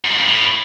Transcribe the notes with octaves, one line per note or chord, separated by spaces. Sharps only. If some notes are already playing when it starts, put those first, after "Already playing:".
F#2
G#2
F2
A2